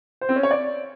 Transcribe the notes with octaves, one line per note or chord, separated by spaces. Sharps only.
C5
C4
C#4
C#5
D5